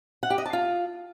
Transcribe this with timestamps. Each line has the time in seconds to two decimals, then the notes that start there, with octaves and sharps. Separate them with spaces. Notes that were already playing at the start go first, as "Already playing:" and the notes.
0.23 F#5
0.30 G4
0.38 D#5
0.46 A5
0.53 F4